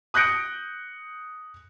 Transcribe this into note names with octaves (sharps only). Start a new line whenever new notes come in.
D#6 F#6 G6 A#6 C#7 D7